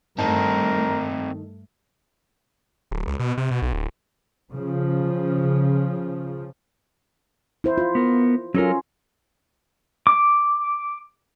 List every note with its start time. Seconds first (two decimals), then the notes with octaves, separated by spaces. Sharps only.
0.19 G2 D#3 A3 C4 D#4 A#4 A5
2.91 D1
3.07 C#2
3.20 B2
3.38 C3
3.51 B2
3.62 B1
3.73 D1
4.54 C#3 F3
7.64 E4 C5
7.78 F4
7.95 B3 A#4
8.55 F#3 C#4 F4 A4 A#4
10.07 D6